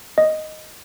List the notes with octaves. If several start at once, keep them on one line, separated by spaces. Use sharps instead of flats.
D#5